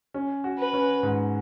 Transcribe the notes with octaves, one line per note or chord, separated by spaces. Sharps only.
C#4
F#4
B4
C#4
G#2